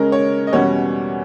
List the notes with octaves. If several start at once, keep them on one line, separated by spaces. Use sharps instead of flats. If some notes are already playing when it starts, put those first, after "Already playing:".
Already playing: C#3 G#3 C#4 A#4
C#5
D#5
E2 B2 G3 C#4 C#5